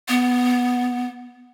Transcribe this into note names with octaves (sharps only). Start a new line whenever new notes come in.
B3